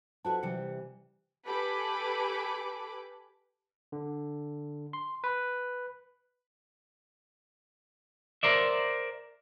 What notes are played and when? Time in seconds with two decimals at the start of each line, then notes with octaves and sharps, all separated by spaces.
0.25 E4 F#4 A4 B4 C5 A5
0.43 C3 E3 G3 C#7
1.46 G4 A4 B4 G#5 B5 D6
3.92 D3
4.93 C6
5.24 B4
8.43 A#4 C5 D5 E5